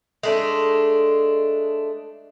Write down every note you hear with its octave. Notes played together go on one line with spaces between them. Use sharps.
G#3 A3 D4